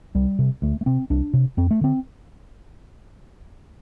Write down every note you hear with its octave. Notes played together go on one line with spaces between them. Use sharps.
C2 G3
C3
D2 A3
A3
C3 C4
C2 D4
C3
F2 C4
A3
D3 C4